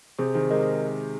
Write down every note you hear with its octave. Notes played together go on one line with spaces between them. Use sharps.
C3 G#4 C5
D#3 G#4 C5
G#3 A#4 D#5